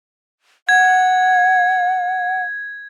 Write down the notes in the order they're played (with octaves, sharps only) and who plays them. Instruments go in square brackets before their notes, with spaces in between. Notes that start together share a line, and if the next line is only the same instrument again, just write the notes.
[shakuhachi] F#5 [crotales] G#6